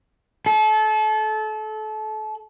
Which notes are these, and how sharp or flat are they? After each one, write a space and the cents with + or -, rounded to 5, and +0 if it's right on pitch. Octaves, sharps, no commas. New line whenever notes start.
A4 -30